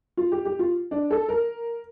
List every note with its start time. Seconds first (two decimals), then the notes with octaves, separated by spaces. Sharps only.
0.17 F4
0.32 G4
0.45 G4
0.59 F4
0.91 D4
1.11 A4
1.29 A#4